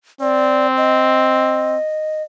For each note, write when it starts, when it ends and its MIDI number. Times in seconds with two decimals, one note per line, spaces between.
0.21 1.77 60
0.21 0.67 74
0.77 2.22 75